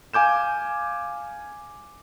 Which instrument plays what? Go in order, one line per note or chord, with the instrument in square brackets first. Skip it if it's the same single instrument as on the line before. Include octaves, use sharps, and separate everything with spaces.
[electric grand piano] F5 G#5 D6 G6 E7